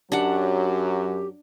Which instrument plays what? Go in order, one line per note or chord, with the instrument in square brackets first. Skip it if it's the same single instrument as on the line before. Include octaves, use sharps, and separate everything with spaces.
[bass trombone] F#2 [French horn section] F#3 [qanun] D4 F#5 [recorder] G4